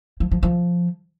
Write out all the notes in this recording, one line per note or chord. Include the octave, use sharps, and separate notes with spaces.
F3
F3
F3